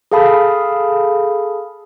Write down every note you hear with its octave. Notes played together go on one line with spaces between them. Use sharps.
G#4 A4 F5 A5 B5 D#6